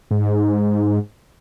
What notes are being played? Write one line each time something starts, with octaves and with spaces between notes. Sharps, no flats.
G#2